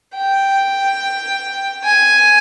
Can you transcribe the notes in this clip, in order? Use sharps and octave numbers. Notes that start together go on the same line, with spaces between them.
G5
G#5